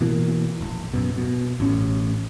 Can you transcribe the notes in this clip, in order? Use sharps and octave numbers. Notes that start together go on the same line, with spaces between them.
B2 E3 A#3
E1 A#1
F#2 B2
B2
A1 A2 C#4